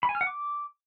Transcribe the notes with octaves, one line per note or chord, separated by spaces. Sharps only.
B5
G#5
F6
F#5
D6